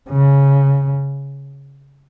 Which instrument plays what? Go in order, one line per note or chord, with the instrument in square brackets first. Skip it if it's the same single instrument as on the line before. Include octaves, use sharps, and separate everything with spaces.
[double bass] C#3